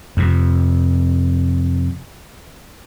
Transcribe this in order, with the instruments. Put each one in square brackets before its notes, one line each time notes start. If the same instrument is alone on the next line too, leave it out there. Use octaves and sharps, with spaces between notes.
[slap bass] F2 C3